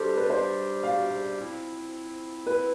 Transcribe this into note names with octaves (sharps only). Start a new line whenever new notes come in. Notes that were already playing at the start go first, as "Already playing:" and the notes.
Already playing: C3 G3 D4 G4 A4 C5
B4
C5
F5
F3 C4 E4
B4